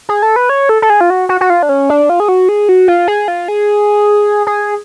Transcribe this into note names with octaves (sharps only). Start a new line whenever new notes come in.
G#4
A4
B4
C#5
A4
A4
G#4
F4
F#4
F#4
F#4
F4
D4
C#4
D4
F4
G#4
F#4
G#4
F#4
F4
G#4
F4
G#4
G#4